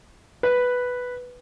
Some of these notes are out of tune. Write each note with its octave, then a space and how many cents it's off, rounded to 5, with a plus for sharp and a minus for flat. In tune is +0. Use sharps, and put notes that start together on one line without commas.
B4 +0